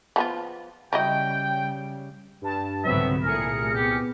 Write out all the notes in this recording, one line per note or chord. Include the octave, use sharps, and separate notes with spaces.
F3 B3 F4
C#3 F#3 G3 E4 D#5 G5
G2 A5
C2 G#2 D3 F#3 B3 C4 E5
C2 A#2 A3 G#4 A#4 C#7
B3 G4